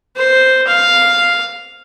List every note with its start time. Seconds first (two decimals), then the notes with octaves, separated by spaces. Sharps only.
0.16 C5
0.67 F5